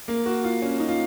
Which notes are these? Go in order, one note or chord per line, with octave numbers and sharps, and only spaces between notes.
A#3
F#4
F4
C#4
D#4
F4